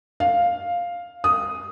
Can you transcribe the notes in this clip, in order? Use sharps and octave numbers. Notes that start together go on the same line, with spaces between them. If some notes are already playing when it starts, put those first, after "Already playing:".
F5
D#6